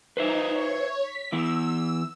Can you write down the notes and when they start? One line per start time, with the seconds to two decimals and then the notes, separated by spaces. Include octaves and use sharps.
0.17 D#4 B4 C5 E5
0.52 C#5
1.02 B6
1.32 E3 B3 E4 E6